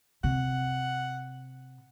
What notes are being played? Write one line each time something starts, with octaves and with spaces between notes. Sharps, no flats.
C3 F#5